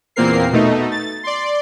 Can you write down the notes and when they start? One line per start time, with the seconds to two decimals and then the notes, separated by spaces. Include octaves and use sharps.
0.16 E2 A#2 A#3 C4 A#4 C7
0.52 B2 A3 D#4
0.91 A6
1.23 D5 C6